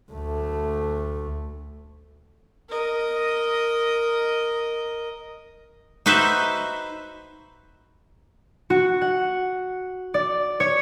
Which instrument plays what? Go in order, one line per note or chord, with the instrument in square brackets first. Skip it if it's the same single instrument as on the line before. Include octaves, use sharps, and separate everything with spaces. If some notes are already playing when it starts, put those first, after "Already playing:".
[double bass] D2 A3
[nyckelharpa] A#4 D#5
[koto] D#4 F#4 B4 C5 E5
[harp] F#4
F#5
D5
C#5